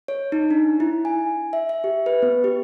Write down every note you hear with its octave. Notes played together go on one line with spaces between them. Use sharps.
C#5
D#4
D4
E4
G#5
E5
E5
G4
B4
B3
G4